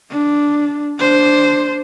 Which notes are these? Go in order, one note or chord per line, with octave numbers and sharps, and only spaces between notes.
D4
D4 C5